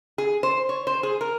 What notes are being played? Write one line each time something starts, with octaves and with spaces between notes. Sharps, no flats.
G#4
C5
C#5
C5
G#4
A#4